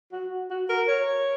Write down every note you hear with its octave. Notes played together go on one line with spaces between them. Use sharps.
F#4
F#4
A#4
C#5